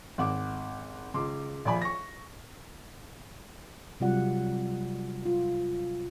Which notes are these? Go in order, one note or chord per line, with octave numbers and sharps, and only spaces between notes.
G#1 F#5 D6
C#2 C6 D6
A#1 F3 D5 G#5 B5
C#6 A#6
C3 F#3 G3 F4 D5 F#5
F4